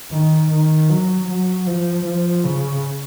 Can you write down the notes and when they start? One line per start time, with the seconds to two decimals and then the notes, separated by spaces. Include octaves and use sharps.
0.11 D#3
0.51 D#3
0.90 F#3
1.29 F#3
1.67 F3
2.06 F3
2.44 C#3